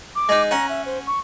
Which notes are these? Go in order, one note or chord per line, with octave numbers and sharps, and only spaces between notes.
D6
G#3 D#4
C#4 F#5 A#5
E5
C5
C#6